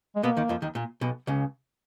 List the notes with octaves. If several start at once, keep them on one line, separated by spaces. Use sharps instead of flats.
G#3
B2 A#3 B3
D#2 D#3
F2 F3
D#2 D#3
A#2
B1 B2
C#2 C#3